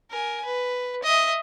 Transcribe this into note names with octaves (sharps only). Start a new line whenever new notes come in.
A#4 G#5
B4
D#5 E5